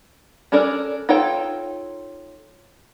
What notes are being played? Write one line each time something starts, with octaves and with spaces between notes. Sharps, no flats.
C#4 D4 A4 A#4 D5
D#4 F4 A4 C#5 G5